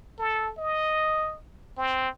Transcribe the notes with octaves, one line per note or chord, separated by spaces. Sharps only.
A4
D#5
C4